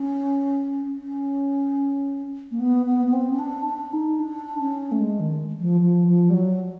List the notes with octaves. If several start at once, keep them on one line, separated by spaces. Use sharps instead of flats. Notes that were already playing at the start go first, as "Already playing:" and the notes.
Already playing: C#4
C#4
A#3
B3
B3
B3
C4
C#4
D4
D4
D#4
D4
C#4
A3
G#3
D#3
F3
F3
F3
G3
F#3